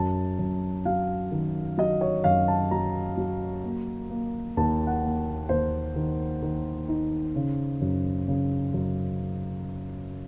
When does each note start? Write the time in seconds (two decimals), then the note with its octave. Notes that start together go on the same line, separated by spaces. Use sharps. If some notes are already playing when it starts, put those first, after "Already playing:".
Already playing: F#2 A5
0.39 F#2
0.85 F#3 F5
1.31 D#3
1.78 F#3 D#5
2.01 C#5
2.24 F#2 F5
2.48 A5
2.71 F#3 A#5
3.17 F#3
3.64 A#3
4.10 A#3
4.57 D#2 A5
4.87 F#5
5.03 A#3
5.49 D#2 C5
5.96 D#3
6.42 D#3
6.88 D#4
7.35 C#3
7.81 F#2
8.28 C#3
8.74 F#2